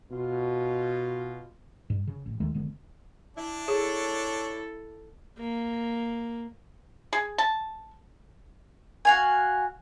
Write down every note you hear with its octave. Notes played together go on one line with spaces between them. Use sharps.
B2 F4
G2
C#3
A1
D#2 D#3 G#3 A3
F1 D3 G#3 B3
D4 E4
E4 G#4 A4 C#5
A#3
G#4
A5
F#4 F5 G#5